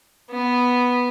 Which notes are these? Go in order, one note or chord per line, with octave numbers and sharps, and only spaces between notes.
B3